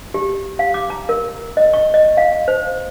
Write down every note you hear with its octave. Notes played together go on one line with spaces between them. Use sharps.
G4
F5
D6
A#5
A#4
D#5
C#6
D#5
F5
C5